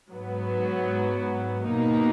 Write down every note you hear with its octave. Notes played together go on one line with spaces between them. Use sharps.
G#2 F#3 B3
B2 A#3 D#4